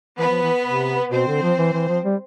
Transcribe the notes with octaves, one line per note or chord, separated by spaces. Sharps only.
E3 B3 B4
F3
E3
C3
B2 C4 C5
D3
F3
E3
E3
F3
G3